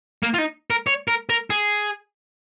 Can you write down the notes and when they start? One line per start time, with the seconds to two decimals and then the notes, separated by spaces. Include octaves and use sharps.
0.23 A#3
0.34 F4
0.38 D#4
0.70 A#4
0.87 C#5
1.08 A#4
1.29 A#4
1.50 G#4